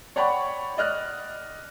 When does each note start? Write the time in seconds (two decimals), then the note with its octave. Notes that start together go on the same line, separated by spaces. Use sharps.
0.16 C#5 D5 F#5 G5 B5 C#6
0.77 D5 D#5 F6 F#6